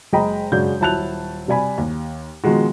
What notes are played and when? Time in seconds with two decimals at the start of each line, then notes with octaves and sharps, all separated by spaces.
0.13 F#1 G#3 D#5 G5 A#5 B5
0.52 F#2 C#3 G#3 D4 F#4 G6
0.80 D#1 F#3 E4 A5 F#6 F7
1.48 C3 G3 D5 G#5 B5
1.78 D#2
2.44 B2 D#3 F3 G#3 F#4